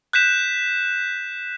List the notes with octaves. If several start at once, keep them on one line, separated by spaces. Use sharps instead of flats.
F#6 G6 B6 E7